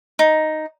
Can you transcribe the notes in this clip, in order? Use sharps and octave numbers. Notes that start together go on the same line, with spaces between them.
D#4